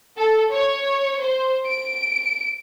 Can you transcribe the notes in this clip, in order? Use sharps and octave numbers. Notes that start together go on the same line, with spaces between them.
A4
C#5
C5
D7